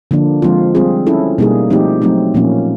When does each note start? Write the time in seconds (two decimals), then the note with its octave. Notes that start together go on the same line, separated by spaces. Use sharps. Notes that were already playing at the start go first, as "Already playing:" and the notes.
0.11 D3 F3 A#3 D4
0.42 F3 G#3 C4 F4
0.75 G3 C4 F4 G#4
1.07 C#4 E4 A4
1.38 B2 G3 A#3 D#4 G#4
1.70 F3 A3 C4 D#4 G4
2.02 F#3 A3 C4 D#4
2.34 A#2 F3 A#3 C#4